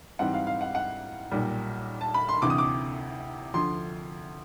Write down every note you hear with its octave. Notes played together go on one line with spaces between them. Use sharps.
G#2 E3 G3 C4 F#5
F5
F5
F#5
F#5
B1 A#2 G3
A5
B5
C6
D2 C3 E3 D6
D#6
D6
D2 D3 F3 C6